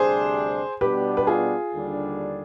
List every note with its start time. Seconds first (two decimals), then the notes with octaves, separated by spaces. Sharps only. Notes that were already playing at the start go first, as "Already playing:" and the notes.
Already playing: D2 C3 G3 D4 G#4 C5
0.81 B2 G3 B3 D4 G4 B4
1.17 B4
1.27 F4 G#4
1.73 D#2 D3 G3 D4